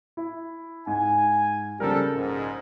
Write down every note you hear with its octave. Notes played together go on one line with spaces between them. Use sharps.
E4
G#2 G#5
C#3 F3 G3 A4 A#4
A#1 G#2